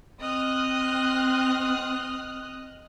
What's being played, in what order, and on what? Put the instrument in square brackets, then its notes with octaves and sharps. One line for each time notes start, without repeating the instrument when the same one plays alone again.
[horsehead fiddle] C4 [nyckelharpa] D#5 [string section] D#6 F6 F#6